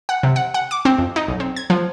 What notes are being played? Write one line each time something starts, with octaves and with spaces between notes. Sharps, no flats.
F#5
C3
F#5
F#5
D6
C4
F2
D#4
B1
C4
G#6
F3